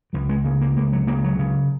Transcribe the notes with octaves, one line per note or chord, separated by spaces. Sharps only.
C#2 F#3
G#3
C#3 A#3
A#3
C#2 A#3
F#3
C#3 A#3
F#3
C#3